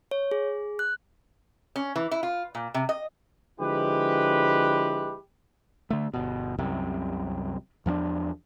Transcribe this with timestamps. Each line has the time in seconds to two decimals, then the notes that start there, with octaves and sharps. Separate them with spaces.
0.11 C#5
0.31 G#4
0.79 F#6
1.76 C#4
1.96 E3
2.11 E4
2.23 F4
2.55 A#2
2.74 C3
2.89 D#5
3.60 D3 F3 G#3 E4 G4 B4
5.90 D3 A3
6.14 G1 B2
6.58 C2 F#2 C3
7.86 E2 F3 B3 D4